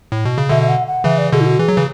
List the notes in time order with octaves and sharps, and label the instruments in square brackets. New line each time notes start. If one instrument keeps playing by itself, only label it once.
[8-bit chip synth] A2
B2
C#3
[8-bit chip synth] B2 D3 [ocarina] E5
[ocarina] E5
F#5
F#5
[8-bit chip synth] C#3 E3 [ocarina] E5
[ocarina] D5
[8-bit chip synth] B2 D3 [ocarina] G#4
[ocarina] E4
F#4
[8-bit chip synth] E3 [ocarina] G#4
[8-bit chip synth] F#3
C#3 E3